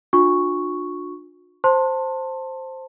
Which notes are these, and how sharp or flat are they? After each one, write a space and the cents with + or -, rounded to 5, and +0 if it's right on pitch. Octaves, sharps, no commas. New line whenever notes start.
D4 +20 F4 +45 C#6 +0
C5 +0 A5 +15 C6 +20